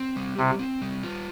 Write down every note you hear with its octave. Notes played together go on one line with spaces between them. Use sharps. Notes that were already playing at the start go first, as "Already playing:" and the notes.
Already playing: C4
G3
C3 C4
C4
G3
F4